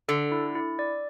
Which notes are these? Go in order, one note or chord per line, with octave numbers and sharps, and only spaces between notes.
D3 A4
E4
E4
D5